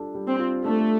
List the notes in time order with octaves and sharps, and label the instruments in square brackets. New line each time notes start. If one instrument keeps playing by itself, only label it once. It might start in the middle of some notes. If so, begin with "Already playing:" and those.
Already playing: [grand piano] G3 D4 F4 A4
G3
[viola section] C4
[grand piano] F4
[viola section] A3 [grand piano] D4